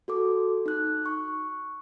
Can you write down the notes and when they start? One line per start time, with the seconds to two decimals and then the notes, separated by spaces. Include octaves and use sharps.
0.08 F#4 A4 D6
0.66 D#4 F#6
1.06 C#6